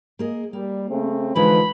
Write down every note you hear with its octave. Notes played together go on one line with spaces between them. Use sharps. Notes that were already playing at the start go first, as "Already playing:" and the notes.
A#3 G#4 D#5
G3 A#3
C#3 A3 C4
D3 E3 F3 G#3 D#4 B4 B5